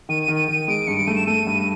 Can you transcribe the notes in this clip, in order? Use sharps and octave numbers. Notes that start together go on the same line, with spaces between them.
D#3 D#7
D#7
D#3
D#7
D#3 D#7
G#3 D7
G2 C#7
D7
A3 D#7
E7
A3 D#7
G2